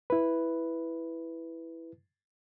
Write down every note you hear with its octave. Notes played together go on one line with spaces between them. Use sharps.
E4 B4